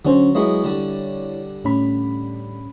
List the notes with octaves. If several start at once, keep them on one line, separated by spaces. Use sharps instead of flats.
D3 F#3 C#4 C5
F#3 G#3 B3 E4 C#5
D3 G3
A2 C#4 B5